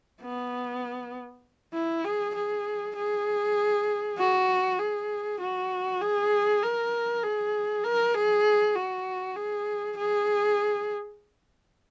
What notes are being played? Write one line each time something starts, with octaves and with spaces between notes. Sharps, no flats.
B3
E4
G#4
G#4
G#4
F#4
G#4
F#4
G#4
A#4
G#4
A#4
G#4
F#4
G#4
G#4